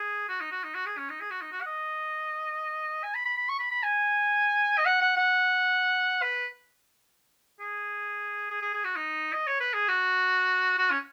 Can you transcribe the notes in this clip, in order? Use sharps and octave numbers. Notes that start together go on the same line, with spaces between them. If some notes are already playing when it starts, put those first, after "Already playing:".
Already playing: G#4
F#4
D#4
F#4
D#4
F#4
G#4
C#4
D#4
G#4
F#4
D#4
F#4
F#5
D#5
G#5
B5
B5
B5
C#6
B5
B5
G#5
D#5
F#5
F#5
F#5
B4
G#4
G#4
G#4
G#4
F#4
D#4
D#5
C#5
B4
G#4
F#4
F#4
C#4